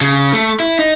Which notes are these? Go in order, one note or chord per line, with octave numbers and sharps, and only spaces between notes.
C#3
A3
E4
D#4